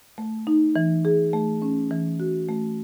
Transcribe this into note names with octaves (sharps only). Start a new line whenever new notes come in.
A3
D#4
E3
G#4
A3
C#4
E3
F#4
A3